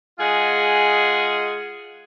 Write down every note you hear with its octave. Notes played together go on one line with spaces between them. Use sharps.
G#3 F4 G#4 D#5 F#5